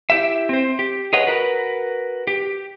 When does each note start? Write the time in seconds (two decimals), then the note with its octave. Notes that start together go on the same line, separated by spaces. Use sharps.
0.10 E4 G4 E5
0.49 C4 C5
0.79 G4
1.13 G#4 B4 C#5 D#5 F#5
1.27 F#4 A#4 B4
2.27 G4